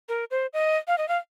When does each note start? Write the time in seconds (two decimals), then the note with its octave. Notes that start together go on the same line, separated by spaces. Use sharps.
0.09 A#4
0.31 C5
0.53 D#5
0.88 F5
0.98 D#5
1.08 F5